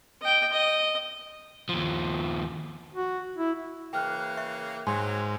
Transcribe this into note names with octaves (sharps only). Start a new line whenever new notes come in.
D#5 G5
D#5
D#2 F3
F#4
E4
C#3 E3 A#3 G5 F6 F#6
E5 C#6
G#2 F#3 G#5 C6